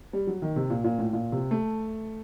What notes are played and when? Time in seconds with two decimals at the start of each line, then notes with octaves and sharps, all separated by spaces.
0.13 G3
0.27 F#3
0.42 D#3
0.56 C3
0.70 A#2
0.84 A#2
0.99 A2
1.13 A#2
1.32 C3
1.51 A3